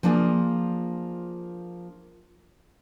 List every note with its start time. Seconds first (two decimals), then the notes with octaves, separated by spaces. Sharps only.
0.03 F3 A#3 D4 F4 G#4